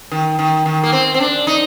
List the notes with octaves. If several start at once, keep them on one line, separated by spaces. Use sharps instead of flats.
D#3
D#3
D#3
A#3
C4
C4
D4
D#4